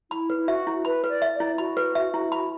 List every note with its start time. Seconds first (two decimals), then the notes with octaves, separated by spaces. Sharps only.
0.11 E4 B5
0.30 B4
0.37 E4
0.48 F#4 E5
0.67 E4
0.85 B4 B5
1.04 B4
1.09 D5
1.22 E5
1.34 D5
1.40 E4
1.58 F#4 B5
1.77 B4
1.95 E5
2.14 E4
2.32 B5